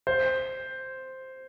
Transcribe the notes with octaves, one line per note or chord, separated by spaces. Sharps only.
C5